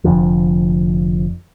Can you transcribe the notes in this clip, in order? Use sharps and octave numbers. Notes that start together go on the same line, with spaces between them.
F1 F2 D3 F3